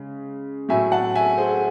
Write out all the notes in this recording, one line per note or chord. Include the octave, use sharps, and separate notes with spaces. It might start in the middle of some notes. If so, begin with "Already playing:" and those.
Already playing: C#3 G#3
A2 F#3 A3 E5 G#5
F#5 A5
E5 G#5
G#4 C5